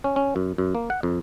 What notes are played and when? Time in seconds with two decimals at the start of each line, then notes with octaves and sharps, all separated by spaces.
0.04 C#4
0.16 C#4
0.36 F#2
0.58 F#2
0.75 A#3
0.90 F#5
1.03 F2